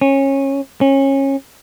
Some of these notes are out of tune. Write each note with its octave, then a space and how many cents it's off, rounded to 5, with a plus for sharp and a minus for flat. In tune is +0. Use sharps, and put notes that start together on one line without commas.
C#4 -20
C#4 -25